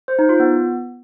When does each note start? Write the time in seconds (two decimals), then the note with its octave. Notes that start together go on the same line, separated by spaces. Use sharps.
0.08 C5
0.19 D#4
0.29 F4
0.40 B3